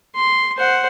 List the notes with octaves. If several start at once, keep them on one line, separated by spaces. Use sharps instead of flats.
C6
C5 F#5